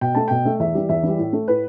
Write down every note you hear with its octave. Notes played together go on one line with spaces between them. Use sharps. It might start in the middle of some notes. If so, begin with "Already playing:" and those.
B2 G5
A3 A5
B2 G5
A3
E2 E5
E3 G3
E2 E5
E3 G3
A2
A3
A2 B4